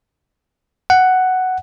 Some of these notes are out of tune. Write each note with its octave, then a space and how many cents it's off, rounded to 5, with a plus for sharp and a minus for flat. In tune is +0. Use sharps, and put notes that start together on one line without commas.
F#5 +5